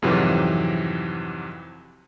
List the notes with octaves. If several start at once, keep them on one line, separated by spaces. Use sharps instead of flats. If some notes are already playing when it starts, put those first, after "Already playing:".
F2 G#2 C3 E3 F#3